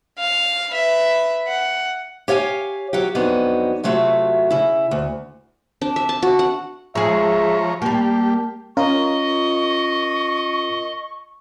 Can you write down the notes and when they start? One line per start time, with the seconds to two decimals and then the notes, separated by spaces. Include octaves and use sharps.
0.19 F5
0.71 B4 E5
1.48 F#5
2.28 G4 C#5 F5 F#5 G#5
2.93 F#3 F4 G4
3.15 F2 F#3 B3 D4 D#4
3.84 C3 F#3 A3 F4 F#4 E5
4.50 C#3 E4
4.91 D2
5.81 D4
5.96 E5
6.09 A5
6.22 F#4
6.39 F#5
6.95 F3 G#3 G#4 C#5 E5 A#5
7.82 G3 A#3 G4 A5
8.77 C#4 F4 A#4 D#5 C#6